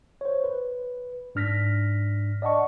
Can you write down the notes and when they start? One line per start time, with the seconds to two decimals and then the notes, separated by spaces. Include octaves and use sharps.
0.21 C5 C#5
0.44 B4
1.35 G#2 D4 F6 A#6 B6
2.42 D5 D#5 F#5 A5 C#6